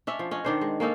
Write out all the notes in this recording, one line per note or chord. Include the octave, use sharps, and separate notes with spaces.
C#4 D4 E5
F3
C#4 D#5 F#5
D#3 D4 C5
G#3
A#3 C#4 D#4 A4